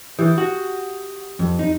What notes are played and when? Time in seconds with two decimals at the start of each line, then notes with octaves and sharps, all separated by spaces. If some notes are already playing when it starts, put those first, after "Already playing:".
0.19 E3 G4 D#6 G6
0.38 F#4
1.39 F2
1.59 D#4